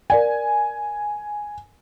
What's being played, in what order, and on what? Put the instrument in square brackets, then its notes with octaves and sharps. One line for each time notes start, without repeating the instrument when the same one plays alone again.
[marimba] A#4 D5 F5 [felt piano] G#5